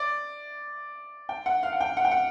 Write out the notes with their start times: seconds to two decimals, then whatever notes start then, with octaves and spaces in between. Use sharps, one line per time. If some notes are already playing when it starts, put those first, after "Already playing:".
Already playing: D5
1.29 G5
1.46 F#5
1.63 F5
1.73 F#5
1.81 G5
1.97 F#5
2.05 G5
2.11 F#5